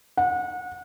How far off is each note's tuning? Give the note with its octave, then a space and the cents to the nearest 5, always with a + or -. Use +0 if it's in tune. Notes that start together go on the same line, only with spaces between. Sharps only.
F#5 -30